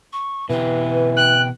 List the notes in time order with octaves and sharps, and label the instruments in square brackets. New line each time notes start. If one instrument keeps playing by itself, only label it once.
[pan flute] C#6
[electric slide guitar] B2 G4 [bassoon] E3 [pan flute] B4
[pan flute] G5 [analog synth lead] F#6